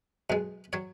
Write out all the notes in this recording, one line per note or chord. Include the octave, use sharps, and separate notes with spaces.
B1 B2 G#3
F#3 C#5